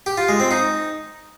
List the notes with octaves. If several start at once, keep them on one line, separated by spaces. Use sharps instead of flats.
G4
F4
G#3
C4
D#4